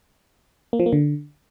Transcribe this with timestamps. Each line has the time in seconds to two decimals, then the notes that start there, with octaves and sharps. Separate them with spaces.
0.73 A#3
0.80 F3
0.86 A#3
0.93 D3